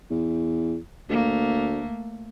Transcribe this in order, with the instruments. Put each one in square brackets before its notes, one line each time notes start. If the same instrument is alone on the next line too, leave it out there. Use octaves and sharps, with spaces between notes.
[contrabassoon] E2
[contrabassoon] D2 [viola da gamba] A3 A#3